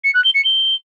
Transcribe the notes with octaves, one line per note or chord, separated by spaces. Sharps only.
C#7
F#6
G7
C#7
G7